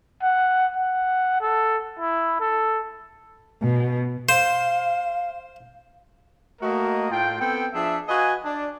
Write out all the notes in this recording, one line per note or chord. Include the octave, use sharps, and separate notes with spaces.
F#5
F#5
A4
E4
A4
B2
C5 F5
A3 A#3 F#4 A#4 D#5
A2 F4 G5
B3 C4 A4 G5
F3 D4 G#4 E5
F#4 B4 D#5 F5 G#5
D4